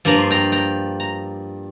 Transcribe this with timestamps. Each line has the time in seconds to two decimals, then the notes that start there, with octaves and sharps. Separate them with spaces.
0.05 G2 F3 A#3 A#5
0.18 C6
0.30 G5 A#5
0.52 G5 A#5
1.00 A#5